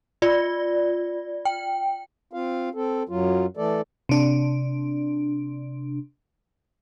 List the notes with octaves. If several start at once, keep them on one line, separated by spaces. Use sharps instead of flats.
F4 D5
G5
C4 F4 F5
C4 A4
F#2 F#3 F4
E3 A3 A4 D5
C3 D4